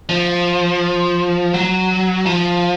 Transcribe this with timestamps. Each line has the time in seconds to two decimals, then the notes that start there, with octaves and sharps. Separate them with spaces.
0.09 F3
1.54 F#3
2.26 F3